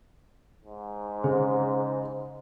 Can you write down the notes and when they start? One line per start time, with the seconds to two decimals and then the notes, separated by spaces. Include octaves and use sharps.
0.65 G#2
1.24 C#3 C5